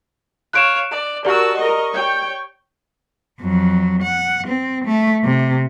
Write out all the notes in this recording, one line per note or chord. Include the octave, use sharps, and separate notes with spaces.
C#5 F5 F#6 D7 E7
D5
F#4 G4 A#4 D5 A5 E6
A#4 D#5 C#6
C#5 G5
F2 F#3
F#5
C4
A3
C3